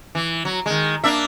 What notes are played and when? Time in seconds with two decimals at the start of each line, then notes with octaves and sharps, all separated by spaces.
0.15 E3
0.45 F#3
0.66 D#3 G#3
1.04 A#3 D4 E5